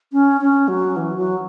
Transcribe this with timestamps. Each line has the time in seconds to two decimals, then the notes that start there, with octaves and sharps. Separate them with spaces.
0.12 C#4
0.41 C#4
0.68 F#3
0.96 E3
1.17 F#3